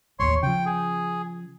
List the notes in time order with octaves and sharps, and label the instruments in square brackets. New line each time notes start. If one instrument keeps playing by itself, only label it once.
[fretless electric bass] A1 D#2 [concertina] C#5 C6
[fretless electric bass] C#3 F3 [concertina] G5
[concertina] G#4